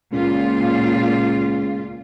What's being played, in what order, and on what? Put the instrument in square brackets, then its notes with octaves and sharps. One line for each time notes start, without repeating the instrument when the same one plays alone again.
[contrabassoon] C#2 [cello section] A#2 F4